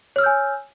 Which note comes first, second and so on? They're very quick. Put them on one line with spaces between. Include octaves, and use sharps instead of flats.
C#5 F6 E6 G6 G#5